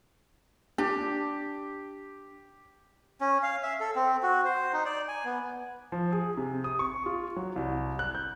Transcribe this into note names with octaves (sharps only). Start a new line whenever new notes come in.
D4 G4
C#4
F5
E5
A4
C4
F#4
C5
D#4
D5
G#5
B3
F3
G#4
C3
D#6
C#6
F4
F#3
C2
F#6
G6